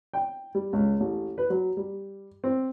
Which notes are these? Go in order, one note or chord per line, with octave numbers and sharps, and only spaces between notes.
G5
G3
C#2
A1
B4
F#3
G3
C4